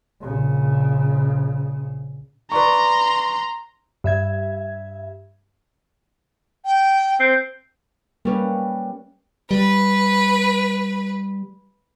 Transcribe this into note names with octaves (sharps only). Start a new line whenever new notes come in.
A#1 C#3
B4 D5 A#5 C6 C#6
G2 E5 G#6
G5
C4
G3 A#3 C#4 B4
G3 B4